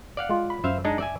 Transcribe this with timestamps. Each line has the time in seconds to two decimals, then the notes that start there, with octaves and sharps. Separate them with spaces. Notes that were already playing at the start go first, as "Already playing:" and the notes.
0.17 D5 F5 F#5
0.29 G#3 F4
0.50 B5
0.64 F#2 C5 E5 F5
0.85 G#3 D4 D#4
0.98 D5 E5 G#5